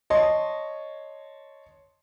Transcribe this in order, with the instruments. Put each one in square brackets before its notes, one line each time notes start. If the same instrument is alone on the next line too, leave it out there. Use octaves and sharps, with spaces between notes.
[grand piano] C#5 A5 C6 [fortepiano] D#5